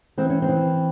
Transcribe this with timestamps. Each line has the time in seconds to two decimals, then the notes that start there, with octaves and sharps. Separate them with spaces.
0.18 E3 C4
0.30 C#4
0.42 C4
0.49 E3